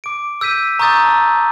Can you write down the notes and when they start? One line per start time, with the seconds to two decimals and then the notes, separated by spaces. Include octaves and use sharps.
0.04 D6 D7
0.41 E6 G6 B6 D#7
0.79 A#5 C#6 D#6 G6 A6
1.06 A5 E6